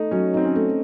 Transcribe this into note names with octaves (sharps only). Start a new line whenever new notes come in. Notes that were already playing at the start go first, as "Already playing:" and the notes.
Already playing: A3 D#4
F#3 C#4
C4 D#4
C#4
A3